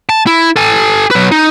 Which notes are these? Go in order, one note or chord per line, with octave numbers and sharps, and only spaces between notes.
A5
E4
A4 G#5
F#3 B4
D#4